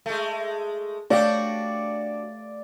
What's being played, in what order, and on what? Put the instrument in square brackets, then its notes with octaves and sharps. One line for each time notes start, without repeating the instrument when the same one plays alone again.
[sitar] G#3 A3
[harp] A3 F5 G5 [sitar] D4 F#4 [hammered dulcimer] D5